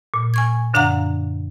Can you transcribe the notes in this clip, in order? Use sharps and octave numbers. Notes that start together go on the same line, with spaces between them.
A#2
G#5 C#6 G#6
F#2 D3 D4 F5 F#5 A#5